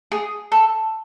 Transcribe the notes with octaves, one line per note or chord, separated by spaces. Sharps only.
G#4
A4